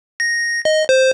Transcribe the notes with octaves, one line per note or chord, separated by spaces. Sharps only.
A#6
D#5
C5